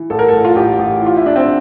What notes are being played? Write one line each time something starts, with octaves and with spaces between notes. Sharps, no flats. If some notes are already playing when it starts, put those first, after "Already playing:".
Already playing: E3
A1 A4
A#4
A1 A4
F4
A1 G4
A1
E3 F4
E4
E3 D4
C4